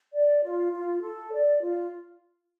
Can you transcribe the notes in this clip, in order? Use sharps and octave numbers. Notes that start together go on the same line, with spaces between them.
D5
F4
F4
A4
D5
F4